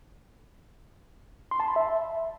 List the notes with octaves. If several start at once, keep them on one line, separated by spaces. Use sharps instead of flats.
C6
A5
B5
E5